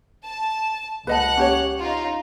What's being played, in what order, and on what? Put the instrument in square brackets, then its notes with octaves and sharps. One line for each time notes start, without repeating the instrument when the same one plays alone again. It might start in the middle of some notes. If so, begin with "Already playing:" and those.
[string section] A5
[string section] C#2 F#5 F#6 [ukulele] B4 D#5 A5
[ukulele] C#4 G4 C#5
[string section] D#4 F4